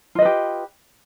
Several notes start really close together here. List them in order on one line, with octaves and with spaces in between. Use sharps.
F4 D#5 B4 G4